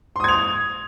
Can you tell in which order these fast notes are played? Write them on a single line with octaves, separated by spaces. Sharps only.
C6 D#6 G#6 F7